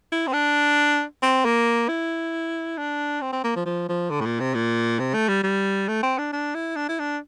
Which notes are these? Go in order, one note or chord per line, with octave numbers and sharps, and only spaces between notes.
E4
C4
D4
C4
A#3
E4
D4
C4
C4
A#3
F3
F3
F3
D3
A2
A#2
C3
A#2
C3
A3
G3
G3
A3
C4
D4
D4
E4
D4
E4
D4